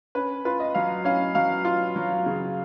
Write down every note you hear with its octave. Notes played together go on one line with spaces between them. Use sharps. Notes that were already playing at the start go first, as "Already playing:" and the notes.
C#4 B4
F4 B4
D#5
F#3 F5
C#4 F5
F#3 F5
F4
F#3
C#3